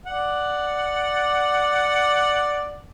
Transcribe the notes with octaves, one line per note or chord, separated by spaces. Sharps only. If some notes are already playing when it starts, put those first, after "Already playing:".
D5 F#5